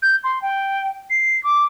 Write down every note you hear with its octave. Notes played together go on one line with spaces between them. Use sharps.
G6
C6
G5
C7
D6